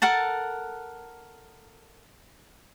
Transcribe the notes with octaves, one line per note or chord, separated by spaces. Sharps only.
A4 A#4 F#5 A5